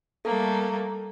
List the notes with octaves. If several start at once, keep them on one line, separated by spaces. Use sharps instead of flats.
G3 A3 A#3 A4